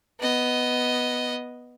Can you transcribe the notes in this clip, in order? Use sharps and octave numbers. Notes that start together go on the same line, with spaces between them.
B3 D#5